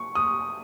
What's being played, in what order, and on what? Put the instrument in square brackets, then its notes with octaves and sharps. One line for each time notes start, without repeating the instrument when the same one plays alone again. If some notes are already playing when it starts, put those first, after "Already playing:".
Already playing: [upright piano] C#6
D#6